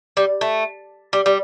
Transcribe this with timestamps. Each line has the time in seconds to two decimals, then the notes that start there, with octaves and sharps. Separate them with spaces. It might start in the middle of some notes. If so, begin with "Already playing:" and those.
0.17 G3
0.41 A3
1.13 G3
1.26 G3